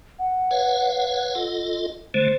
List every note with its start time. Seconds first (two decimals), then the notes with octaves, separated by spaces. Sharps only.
0.19 F#5
0.51 B4 C#5 F5
1.35 F4 A4 D#5
2.14 D3 G#3 A3 C5